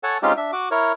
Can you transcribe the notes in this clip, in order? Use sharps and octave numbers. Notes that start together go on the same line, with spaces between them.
A4 C#5 F#5 G#5 A5
G#3 C4 C#4 D#4 F4 G4
D4 E5
F#4 D6
E4 A#4 C#5